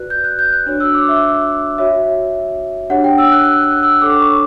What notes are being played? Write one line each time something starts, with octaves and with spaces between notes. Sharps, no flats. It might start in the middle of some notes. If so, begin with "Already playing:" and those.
Already playing: F#4 B4 D5 F#6
G6
F#6
G6
F#6
D4 F#4 C#5 F#6
E6
D6
E5
F#4 C#5 E5
D4 G4 C#5 F#5
G5
E6
F#6
F#6
F#6
E6
D4 A4 C#5 D6
C#6